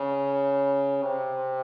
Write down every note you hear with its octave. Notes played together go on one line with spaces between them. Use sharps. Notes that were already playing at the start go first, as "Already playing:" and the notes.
Already playing: C#3
C3